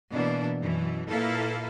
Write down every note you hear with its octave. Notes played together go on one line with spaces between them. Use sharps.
B2 E3 A#3 D4
F#2 B2 E3
A#2 A#3 E4 A4 B4 F5